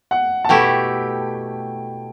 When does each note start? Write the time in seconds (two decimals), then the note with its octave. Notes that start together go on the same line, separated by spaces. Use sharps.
0.11 F#5
0.45 A5
0.49 B2 A3 E4 G4 G5